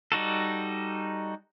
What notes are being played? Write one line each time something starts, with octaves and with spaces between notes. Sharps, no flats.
G3 D#4 F#4 A4